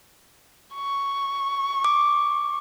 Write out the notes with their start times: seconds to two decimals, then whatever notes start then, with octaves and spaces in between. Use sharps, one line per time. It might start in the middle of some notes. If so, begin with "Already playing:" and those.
0.75 C#6
1.85 D6